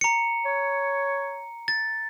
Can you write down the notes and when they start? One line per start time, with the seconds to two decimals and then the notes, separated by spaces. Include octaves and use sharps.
0.01 A#5 C#7
0.45 C#5
1.68 A6